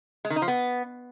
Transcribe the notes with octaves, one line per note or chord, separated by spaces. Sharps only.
G#3
D#3
D#4
F3
B3